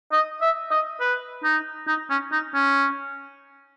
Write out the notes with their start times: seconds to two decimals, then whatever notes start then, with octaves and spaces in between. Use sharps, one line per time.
0.12 D#5
0.41 E5
0.71 D#5
1.00 B4
1.44 D#4
1.88 D#4
2.10 C#4
2.32 D#4
2.54 C#4